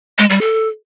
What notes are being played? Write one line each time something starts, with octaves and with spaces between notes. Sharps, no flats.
G#3
G3
A4